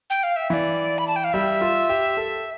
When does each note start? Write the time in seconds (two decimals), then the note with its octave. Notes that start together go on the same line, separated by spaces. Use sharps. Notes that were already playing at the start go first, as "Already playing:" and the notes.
0.10 G5
0.23 F5
0.36 E5
0.50 E3 D5 E5
0.98 B5
1.07 A5
1.16 G5
1.24 F5
1.33 G3 E5
1.61 F4
1.89 G4
2.17 A4